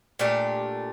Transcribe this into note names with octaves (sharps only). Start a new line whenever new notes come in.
A#2 A3 D4 G4